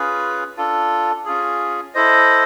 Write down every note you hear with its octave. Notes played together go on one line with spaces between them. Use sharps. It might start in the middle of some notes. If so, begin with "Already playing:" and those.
Already playing: C#4 F4 G#4 B4
D4 F4 A4
C#4 F4 G#4
E4 A4 C5 D#5